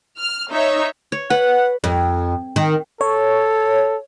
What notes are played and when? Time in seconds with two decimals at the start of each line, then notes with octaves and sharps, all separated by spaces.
0.17 F6
0.52 D#4 C#5 E5
1.12 C#5
1.30 B4 F#5
1.84 F2
2.56 D#3
3.01 A4 C#5